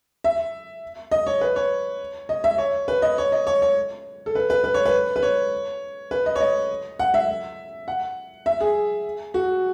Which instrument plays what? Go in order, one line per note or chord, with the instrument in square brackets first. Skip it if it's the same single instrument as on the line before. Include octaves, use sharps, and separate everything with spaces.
[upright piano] E5
D#5
C#5
B4
C#5
D#5
E5
C#5
B4
D#5
C#5
D#5
C#5
C#5
A4
B4
B4
B4
C#5
B4
B4
C#5
B4
D#5
C#5
D#5
F#5
E5
F#5
E5
G#4
F#4